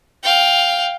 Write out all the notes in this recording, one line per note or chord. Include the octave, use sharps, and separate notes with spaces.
F5 G5